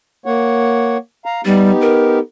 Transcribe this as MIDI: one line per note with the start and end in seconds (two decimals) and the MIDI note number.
0.26 0.97 58
0.26 0.97 73
0.26 0.97 78
1.25 1.41 77
1.25 1.41 82
1.45 1.72 55
1.45 2.19 59
1.45 2.19 63
1.45 2.19 67
1.81 2.19 70